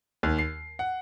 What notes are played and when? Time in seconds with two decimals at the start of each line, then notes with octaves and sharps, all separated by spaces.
0.23 D#2
0.39 C7
0.79 F#5